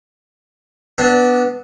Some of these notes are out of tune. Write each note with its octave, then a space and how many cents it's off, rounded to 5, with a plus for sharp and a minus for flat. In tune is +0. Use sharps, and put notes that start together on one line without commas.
B3 +0 D4 +0 E5 -35